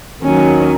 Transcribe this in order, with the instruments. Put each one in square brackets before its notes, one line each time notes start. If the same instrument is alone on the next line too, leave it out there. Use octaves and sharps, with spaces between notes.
[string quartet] D#2 D#3 F#3 C#4